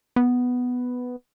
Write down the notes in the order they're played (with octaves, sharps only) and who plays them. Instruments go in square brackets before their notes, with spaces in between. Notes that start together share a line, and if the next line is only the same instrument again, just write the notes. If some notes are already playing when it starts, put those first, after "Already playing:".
[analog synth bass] B3